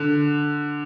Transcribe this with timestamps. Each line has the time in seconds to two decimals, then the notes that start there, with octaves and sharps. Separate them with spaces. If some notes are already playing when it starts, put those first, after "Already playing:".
Already playing: D3